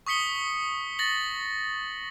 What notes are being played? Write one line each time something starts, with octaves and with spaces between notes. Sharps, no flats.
C#6 D#6 B6 C#7 G7
A6 A#6 F#7